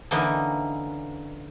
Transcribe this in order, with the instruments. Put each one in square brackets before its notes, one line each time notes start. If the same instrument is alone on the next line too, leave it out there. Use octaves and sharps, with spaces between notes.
[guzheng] D3 E3 A#3 C#4 D#4 B4